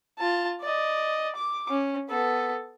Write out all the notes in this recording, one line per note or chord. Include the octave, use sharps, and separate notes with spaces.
F4 A5
D5 D#5
D6
C#4
B3 A4